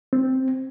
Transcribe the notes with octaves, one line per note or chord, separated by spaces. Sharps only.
C4